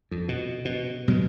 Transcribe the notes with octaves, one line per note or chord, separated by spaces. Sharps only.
F2
B2
B2
B2 F#3 G#3